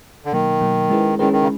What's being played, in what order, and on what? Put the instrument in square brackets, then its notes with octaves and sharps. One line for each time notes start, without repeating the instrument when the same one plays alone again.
[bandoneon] D3
[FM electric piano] B2 F#3 A#3 [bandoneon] D#3
[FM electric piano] B2 F#3 A#3
G#3 C#4 E4 G#4 B4
[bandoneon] D#3 [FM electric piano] G#3 C#4 E4 G#4 B4
[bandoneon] D#3
C#3